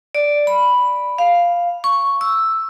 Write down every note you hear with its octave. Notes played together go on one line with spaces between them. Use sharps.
D5
B5
F5
C#6
E6